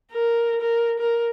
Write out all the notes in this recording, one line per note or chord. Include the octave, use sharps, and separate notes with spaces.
A#4
A#4
A#4